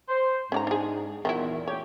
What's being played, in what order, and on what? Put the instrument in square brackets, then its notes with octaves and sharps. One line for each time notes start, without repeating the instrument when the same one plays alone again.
[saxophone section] C5
[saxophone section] G#2 [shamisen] C#4 D5 A#5
[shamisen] D4 G#4
[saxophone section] E2 A#2 [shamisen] D#3 F#3 E4
[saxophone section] A3 C#4 G4 [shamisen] C#5